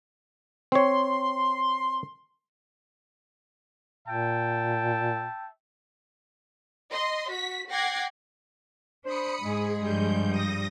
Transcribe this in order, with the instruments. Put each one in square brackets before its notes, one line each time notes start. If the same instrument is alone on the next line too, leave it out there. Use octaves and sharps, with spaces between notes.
[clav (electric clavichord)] C4 C#5 [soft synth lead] C6
[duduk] A#2 [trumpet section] E5 G5 A5
[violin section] D#5 C6
F#4 B6
F#5 G5 D6 G#6 A#6 C7
[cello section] D4 [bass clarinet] C5 [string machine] B5 D#6 C#7
[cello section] G#2 [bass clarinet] G#3 [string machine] G#4
[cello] G2 [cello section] F3 G3 [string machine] G6
[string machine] D#6 A#6